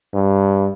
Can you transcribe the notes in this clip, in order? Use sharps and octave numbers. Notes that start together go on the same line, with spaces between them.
G2